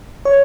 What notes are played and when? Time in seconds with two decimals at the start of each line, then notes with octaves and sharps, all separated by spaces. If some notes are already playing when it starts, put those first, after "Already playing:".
0.25 C#5